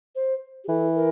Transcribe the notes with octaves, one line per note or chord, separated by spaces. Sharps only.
C5
G4
E3 A4
A#4